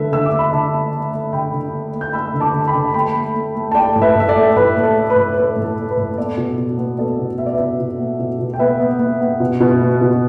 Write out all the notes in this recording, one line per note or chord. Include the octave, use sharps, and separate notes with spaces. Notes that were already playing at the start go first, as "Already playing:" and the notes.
Already playing: D3 A3 B4 E5
D3 E6
D6
A3
B5
D3 E5 A5
A3
A3
A3
D3 G5 B5
D3
A3
A3
G6
A3 B5 E6
D3
A5 D6
D3
G5 B5
D3
A3 G5 B5
A3
A3
A3
A5
A3 D5 G5
A2
B4 E5
A2 E5
A4 D5
A3
A2 B4
A3
A4
A3
B4
A2
A3 B4
A2
A4
A3
B4
A2
B3 A4 D5
B2
B2
B3
B3 A4 D5
B2
B3 E5
D5
B4 E5
B2
B2
B3
B2
B2
G5
B3 B4 E5
B3
B3
B3
B2
B2
B3
B2